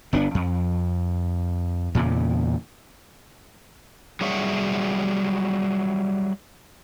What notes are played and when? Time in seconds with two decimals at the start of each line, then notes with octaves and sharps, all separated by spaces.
0.13 G1 B3 C#4 D4
0.35 F2
1.95 E2 A#2 C#3
4.21 F#3 G3 G#4 C#5 E5 F#5